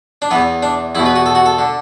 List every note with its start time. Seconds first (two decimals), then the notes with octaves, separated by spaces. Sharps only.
0.22 D4
0.31 E2 E3 B3
0.63 D4
0.95 E2 E4
0.99 B2
1.06 B4
1.16 F#4
1.26 A4
1.35 F#4
1.46 A4
1.59 D3